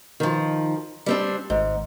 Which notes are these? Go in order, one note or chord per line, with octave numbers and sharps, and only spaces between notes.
D#3 F3
G3 C4 D4
G#1 G#2